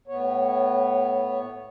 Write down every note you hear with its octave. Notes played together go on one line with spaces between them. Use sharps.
A2 B3 C#5